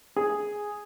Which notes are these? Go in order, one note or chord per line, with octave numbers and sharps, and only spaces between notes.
G#4